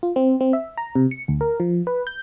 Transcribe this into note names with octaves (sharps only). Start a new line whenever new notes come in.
F4
C4
C4
E5
A#5
C3
C#7
D2
A#4
F3
B4
G6